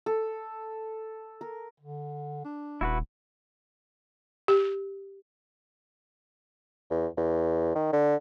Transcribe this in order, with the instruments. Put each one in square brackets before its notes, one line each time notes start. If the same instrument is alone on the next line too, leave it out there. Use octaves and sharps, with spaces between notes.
[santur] A4
A#4
[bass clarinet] D3
D4
[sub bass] D#1 [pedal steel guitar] E4 F#4 B4
[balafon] G4
[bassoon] E2
E2
D#3
D3